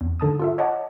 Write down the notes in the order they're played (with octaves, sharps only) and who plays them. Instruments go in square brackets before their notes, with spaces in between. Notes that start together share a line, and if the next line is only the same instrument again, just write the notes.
[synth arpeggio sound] E2
G#2 D3 A5 D#6
F4 A4 E5
C#5 D#5 F#5 A5 D6